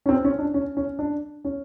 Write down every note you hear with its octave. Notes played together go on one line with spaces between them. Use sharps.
C#4
C4
C#4
D4
C#4
C#4
D4
C#4